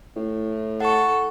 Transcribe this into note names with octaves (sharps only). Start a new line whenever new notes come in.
A2
A4 F#5 C#6